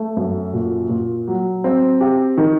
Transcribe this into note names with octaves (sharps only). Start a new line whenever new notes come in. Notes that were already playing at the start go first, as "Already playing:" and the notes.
Already playing: A3
F#2
A#2
A#2
F#3
C4
G4
D#3